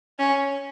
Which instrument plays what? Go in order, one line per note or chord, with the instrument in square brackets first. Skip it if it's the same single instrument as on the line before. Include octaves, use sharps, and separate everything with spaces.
[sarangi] C#4